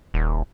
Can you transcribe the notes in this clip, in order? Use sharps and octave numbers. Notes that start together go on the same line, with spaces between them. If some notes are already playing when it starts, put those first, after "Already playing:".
D#1